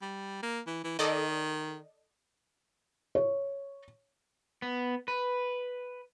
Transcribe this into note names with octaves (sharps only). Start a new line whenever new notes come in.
G3
A#3
E3
E3
D#3 A4 D5 D#5
C#5
B3
B4